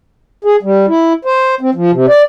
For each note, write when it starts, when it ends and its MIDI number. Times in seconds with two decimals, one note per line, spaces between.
0.44 0.56 68
0.63 0.86 55
0.88 1.13 64
1.25 1.55 72
1.61 1.70 60
1.75 1.91 53
1.91 2.06 48
2.09 2.22 74